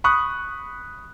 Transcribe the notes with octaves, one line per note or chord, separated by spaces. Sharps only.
B5 C#6 D#6 F#6